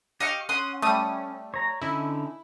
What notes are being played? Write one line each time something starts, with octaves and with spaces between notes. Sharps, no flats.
G4 D#5 F5 C#6
C#4 F#5 C6 D#6
G3 A3 D#6
C#5 A#5
D3 C#4 D#4 E4